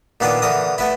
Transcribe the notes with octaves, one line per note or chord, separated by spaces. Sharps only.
A#2 D#3 B3 D4 F4
D3 E3 A#4 D#6
A3 B3 E4